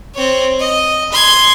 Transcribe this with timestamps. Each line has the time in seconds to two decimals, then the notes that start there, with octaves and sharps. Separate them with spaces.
0.15 C4 C#5
0.60 D#5
1.12 C6 G#6